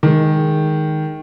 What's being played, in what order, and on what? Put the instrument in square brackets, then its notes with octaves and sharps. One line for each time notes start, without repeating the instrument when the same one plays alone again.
[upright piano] D#3 G#3